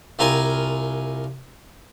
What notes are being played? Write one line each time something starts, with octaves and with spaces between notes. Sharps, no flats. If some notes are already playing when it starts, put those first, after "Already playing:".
C2 C4 F4 A#4 G#5